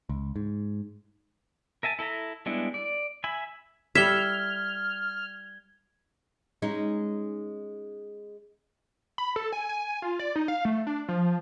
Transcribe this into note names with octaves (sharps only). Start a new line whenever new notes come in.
C#2
G#2
A#4 E5 G#5 A5
E4 A4 E5 A#5
G3 G#3 B3 D4 E4
D5
E5 G#5 B5
G3 E4 A4 E5 F6 G#6 G7
G#3 C#4 D#4
B5
A4
G#5
G#5
F4
D5
D#4
F5
A3
D4
F3